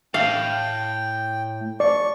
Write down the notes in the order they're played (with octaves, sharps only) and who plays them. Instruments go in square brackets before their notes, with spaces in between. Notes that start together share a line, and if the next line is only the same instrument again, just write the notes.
[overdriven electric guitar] A2 [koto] F5 [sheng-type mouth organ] G5
[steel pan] D5 [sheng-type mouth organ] C#6